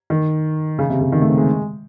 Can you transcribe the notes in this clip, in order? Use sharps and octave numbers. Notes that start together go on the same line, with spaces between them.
D#3
C#3
C3
C#3
D#3
A3
C4
G#3